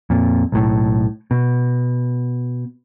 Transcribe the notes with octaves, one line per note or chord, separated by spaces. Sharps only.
F2 A#2
B1 A2
B2